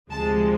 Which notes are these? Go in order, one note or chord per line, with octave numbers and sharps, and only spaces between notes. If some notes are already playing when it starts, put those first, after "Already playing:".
D2 C3 F3 G#3 A5